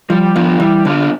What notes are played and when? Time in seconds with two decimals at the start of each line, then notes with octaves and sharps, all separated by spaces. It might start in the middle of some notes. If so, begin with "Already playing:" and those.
0.10 F3 G3
0.35 F3 B3 D4 F4
0.60 E3 G3
0.85 D3 B3 D4 F4